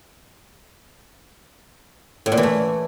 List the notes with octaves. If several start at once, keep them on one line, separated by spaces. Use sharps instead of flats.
A2
A#2
E3
A3